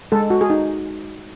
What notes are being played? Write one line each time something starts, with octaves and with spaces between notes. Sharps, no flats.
G#3 A4
F#4
G#4
D#4